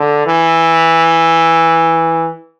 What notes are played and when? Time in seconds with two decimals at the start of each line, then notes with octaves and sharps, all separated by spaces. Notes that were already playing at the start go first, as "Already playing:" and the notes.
Already playing: D3
0.26 E3